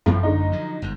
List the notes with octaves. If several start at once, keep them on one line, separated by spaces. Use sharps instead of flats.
A1 F#2 A2 F3
D3 D#4
F3 F#3
G1 G#2